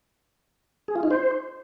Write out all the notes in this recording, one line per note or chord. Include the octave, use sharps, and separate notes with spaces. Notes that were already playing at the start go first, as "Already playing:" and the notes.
G#4
F4
D#4
C5